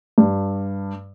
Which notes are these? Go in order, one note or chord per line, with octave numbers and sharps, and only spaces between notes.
G2